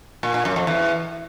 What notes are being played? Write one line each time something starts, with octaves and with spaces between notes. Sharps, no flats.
A#2
A#2
F#2
F2
E2